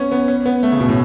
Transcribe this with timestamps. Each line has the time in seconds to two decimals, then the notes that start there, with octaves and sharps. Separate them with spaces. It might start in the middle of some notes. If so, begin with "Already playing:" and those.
Already playing: B3 C#4
0.12 B3
0.28 C#4
0.46 B3
0.63 A3
0.72 C#3
0.80 B2
0.89 A2